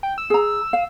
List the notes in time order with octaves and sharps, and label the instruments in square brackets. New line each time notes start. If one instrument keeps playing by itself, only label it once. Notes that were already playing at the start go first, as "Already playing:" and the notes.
[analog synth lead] G5
E6
[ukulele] G#4 A#5
F5